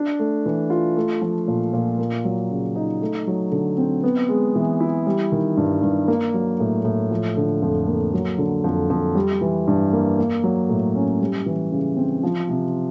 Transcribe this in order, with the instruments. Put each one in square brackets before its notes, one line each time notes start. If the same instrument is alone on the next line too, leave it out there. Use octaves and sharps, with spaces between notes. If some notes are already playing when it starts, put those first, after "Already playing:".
Already playing: [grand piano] D4
A3
E3
F4
A3
F3
A#2
A#2
A#3
F#3
C#3
D#4
A3
F#3
D3
C4
B3
G#3
E3
E4
G3
D#3
G2
G2
A#3
F#3
A2
A2
F3
D3
F2
A#3
F#3
D3
F2
F2
G3
E3
G2
A#3
A#3
F#3
A2
C#4
G3
E3
C#3
C4
F3
C3